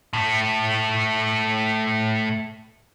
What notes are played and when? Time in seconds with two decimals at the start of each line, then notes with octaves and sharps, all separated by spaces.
0.13 A2 A3